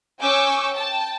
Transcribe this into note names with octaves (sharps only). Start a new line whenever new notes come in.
C#4 G#5 C#6 D6 E6 G6
G5 A5